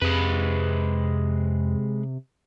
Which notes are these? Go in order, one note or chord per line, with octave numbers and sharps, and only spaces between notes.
F2 C3 G#3 B4